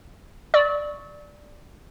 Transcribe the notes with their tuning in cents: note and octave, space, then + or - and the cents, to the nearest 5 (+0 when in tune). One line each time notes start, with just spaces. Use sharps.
D5 +0 C#6 +0 E6 -40